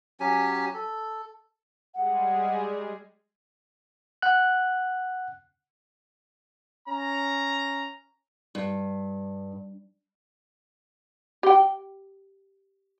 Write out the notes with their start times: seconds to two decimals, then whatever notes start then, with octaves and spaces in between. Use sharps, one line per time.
0.20 F#3 C#4 G4 G#5
0.74 A4
1.94 G3 G#3 G#4 F#5
4.22 F#5 F#6
6.88 C#4 A#5
8.55 G2
11.43 G4 G5